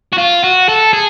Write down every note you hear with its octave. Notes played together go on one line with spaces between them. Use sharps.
F#4
F4
F#4
A4
G#4